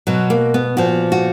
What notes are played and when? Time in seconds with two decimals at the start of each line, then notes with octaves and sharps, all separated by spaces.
0.07 B2 F#3
0.30 A#3
0.54 B3
0.77 A#2 F3 F#4
1.12 F#4